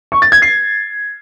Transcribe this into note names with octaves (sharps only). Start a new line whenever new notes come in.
C#6
A6
G#6
C7